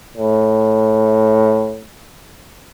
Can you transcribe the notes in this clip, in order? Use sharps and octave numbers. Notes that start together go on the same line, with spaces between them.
A2